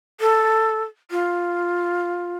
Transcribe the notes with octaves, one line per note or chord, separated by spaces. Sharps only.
A4
F4